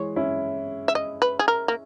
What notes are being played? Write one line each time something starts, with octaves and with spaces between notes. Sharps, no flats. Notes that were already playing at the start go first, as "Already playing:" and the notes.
Already playing: E3 G#3 C#5
C#4 E4
E5
D#5
B4
G#4
A#4
A#3